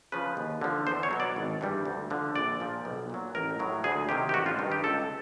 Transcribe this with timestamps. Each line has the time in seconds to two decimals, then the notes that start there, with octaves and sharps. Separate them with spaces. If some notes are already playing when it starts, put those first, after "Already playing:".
0.12 C#3 F3 B4
0.37 D#2
0.61 D3 F3
0.86 E2 C5
1.03 C#5
1.11 B2 F#3
1.20 D5
1.36 G#1
1.61 G2 E3 G3
1.85 D2
2.10 D3 F3
2.36 A#1 D5
2.60 A#2 F3
2.85 B1
3.10 A#2 F#3
3.35 A1 A#4
3.59 A2 F#3
3.84 D2 G#4
4.09 C3 D#3 F#3 G4
4.29 G4
4.34 A1 F#4
4.46 F4
4.59 G2 D#3
4.72 G4
4.84 C#2 A4